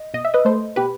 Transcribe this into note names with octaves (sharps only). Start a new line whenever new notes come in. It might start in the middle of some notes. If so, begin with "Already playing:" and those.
Already playing: D#5
B2 D#5
E5
B4 D#5
A3 A4 C5
B2 G4 B4